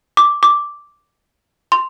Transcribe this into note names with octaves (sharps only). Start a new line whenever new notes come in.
D6
D6
C6